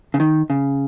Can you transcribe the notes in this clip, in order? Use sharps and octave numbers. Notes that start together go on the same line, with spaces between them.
C#3
D#3
C#3